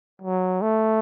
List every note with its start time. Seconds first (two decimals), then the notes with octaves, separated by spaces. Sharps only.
0.22 F#3
0.62 A3